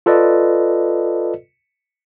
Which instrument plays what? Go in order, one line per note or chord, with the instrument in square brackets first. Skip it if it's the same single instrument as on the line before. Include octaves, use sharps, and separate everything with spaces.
[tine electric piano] F4 A4 B4 D5 D#5